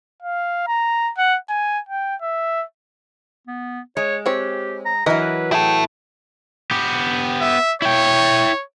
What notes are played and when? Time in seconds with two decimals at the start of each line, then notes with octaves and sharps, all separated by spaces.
0.22 F5
0.67 A#5
1.18 F#5
1.50 G#5
1.89 G5
2.22 E5
3.48 B3
3.97 G#3 C#5
4.26 C4 G4 C#5
4.85 A#5
5.06 E3 F#3 A#4 B4 D#5
5.52 E4 G#4 A4 G5
6.71 B3 G4
7.41 E5
7.82 E4 C#5 G5